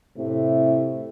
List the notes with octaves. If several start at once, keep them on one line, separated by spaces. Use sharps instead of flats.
A2 C3 A3 E4